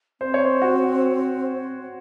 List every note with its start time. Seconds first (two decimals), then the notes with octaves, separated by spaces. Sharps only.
0.21 C4 C5
0.34 C#5
0.45 C5
0.62 F#4